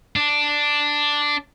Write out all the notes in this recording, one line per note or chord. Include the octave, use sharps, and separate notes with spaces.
D4